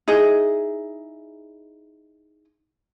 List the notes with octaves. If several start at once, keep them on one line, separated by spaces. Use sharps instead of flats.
D#4 E4 G#4 D#5